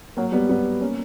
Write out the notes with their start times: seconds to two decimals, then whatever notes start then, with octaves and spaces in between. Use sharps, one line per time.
0.17 F#3 A#3
0.32 G3 B3
0.49 G3 B3
0.81 A#3 C#4